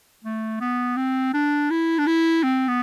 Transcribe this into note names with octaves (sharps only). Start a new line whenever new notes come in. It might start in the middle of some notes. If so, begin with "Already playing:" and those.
A3
B3
C4
D4
E4
D4
E4
C4
B3